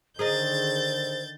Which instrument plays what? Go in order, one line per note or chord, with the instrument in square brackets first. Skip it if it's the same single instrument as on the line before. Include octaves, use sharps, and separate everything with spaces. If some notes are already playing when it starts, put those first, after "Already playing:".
[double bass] D3 D#3 [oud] G#4 A#4 D#5 [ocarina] C5 [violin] G6 A6